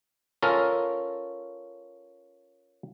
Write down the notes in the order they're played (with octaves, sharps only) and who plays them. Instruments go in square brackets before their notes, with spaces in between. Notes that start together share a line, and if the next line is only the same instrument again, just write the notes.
[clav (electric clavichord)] C#4 F4 A4 A#4 A5